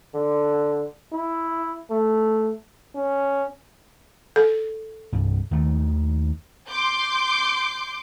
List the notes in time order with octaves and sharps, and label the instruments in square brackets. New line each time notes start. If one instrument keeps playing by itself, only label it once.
[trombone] D3
E4
A3
C#4
[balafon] A4
[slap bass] C2 G2
D#2 D#3 A3
[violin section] C6 D6 G6